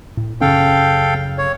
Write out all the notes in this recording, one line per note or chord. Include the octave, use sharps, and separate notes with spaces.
A2
F#2 C#3 C#4 A4 F5 G5
C#5